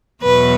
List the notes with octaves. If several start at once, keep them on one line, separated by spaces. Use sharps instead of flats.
E2 B2 F#3 B3 B4